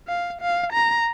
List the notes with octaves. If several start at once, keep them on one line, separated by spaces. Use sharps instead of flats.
F5
F5
A#5